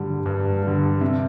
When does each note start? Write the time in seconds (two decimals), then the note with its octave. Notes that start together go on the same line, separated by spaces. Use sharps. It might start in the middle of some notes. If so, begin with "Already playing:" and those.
Already playing: G2 D3 G3
0.26 G2
0.63 D3 G3
1.01 C3